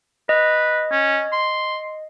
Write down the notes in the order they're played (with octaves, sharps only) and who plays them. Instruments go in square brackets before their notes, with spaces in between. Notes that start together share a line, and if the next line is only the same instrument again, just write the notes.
[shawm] B4 [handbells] D#5
[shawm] C#4
C6